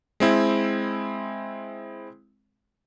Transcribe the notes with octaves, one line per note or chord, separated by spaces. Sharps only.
G#3 C4 E4